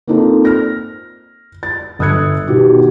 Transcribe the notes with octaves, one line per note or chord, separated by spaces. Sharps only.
A#3 C4 D#4 F4 A4
F6 A#6
A6
G1 D#6 E6 F#6 G#6 C#7
B2 D#3 F#4 G4